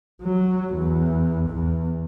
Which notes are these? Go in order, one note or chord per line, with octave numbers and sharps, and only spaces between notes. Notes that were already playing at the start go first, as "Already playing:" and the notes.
F#3
E2
E2